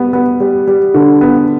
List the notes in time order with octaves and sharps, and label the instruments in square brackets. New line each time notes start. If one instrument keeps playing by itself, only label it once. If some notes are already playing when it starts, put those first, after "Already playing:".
Already playing: [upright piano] G3 B3
B3
G3
G3
D3
B3